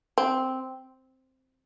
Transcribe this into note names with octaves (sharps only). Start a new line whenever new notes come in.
C4